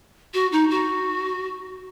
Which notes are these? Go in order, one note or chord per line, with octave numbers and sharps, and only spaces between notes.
F#4
D#4
F#4